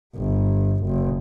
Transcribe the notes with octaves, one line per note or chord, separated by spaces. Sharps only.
G1
F#1